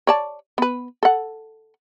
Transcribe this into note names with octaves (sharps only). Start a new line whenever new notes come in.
C#5 D5 A5
B3 B4
A4 F#5